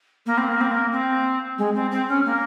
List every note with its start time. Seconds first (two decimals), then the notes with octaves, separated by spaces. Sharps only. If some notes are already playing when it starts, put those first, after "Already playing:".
0.26 A#3
0.37 C4
0.48 A#3
0.60 C4
0.71 A#3
0.92 C4
1.58 G#3
1.74 C4
1.91 C4
2.08 C#4
2.25 A#3